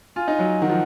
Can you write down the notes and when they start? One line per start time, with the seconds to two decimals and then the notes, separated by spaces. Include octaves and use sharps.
0.16 F4 G#5
0.28 D#4
0.39 F#3
0.62 D#3 F#5
0.69 F3